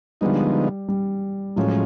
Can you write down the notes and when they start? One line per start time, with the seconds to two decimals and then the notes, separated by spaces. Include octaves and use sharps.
0.21 D3 F3 G3 G#3 B3 D#4
0.88 G3
1.56 A2 F3 F#3 G#3 C#4